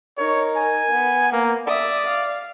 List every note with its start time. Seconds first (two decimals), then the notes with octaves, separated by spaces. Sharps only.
0.18 D#4 A#4 C#5
0.56 G#5
0.90 B3
1.32 A#3
1.67 D5 E5 D#6
2.08 F5